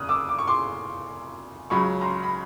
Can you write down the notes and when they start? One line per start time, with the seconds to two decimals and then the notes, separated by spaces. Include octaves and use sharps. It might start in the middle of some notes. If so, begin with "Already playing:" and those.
Already playing: F1 E2 C#3 D#6 F6 F#6
0.09 D6 E6
0.29 D6
0.39 C#6
0.47 C6 D6
1.70 C#2 C#3 F#3 B5 C#6
2.01 A#5 C6
2.23 B5